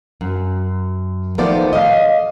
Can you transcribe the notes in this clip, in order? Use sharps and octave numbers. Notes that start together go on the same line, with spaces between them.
F#2
D#3 F3 A3 B3 C5 D5
D#5 F5